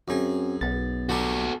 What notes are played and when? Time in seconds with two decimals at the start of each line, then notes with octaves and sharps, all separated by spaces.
0.08 F#2 C4 C#4 F#4 G#4
0.61 B1 B3 A6
1.09 F#3 G3 F#4 G4 A4